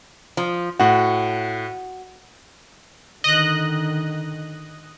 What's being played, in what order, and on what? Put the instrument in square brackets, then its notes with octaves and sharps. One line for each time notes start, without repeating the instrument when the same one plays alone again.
[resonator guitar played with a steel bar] F3
[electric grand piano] A2 F#5 [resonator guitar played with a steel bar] F#4
[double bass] D3 D#3 [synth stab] D#5 F#6